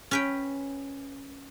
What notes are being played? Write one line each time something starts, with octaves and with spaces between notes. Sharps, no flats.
C#4 B4 G5